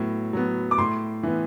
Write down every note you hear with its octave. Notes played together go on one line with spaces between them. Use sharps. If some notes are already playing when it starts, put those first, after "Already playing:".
Already playing: A2 F#3 B3
F#3 B3
D6
A2 C6
E3 B3